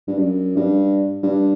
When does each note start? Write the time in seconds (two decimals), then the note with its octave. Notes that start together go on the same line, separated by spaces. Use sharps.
0.07 G2
0.18 F#2
0.56 G2
1.23 G2